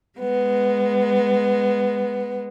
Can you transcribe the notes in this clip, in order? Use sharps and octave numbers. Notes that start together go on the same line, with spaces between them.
G#3 B3